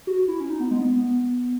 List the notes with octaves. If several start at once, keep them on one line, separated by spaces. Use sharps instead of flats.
F#4
E4
C#4
D#4
B3
G#3
B3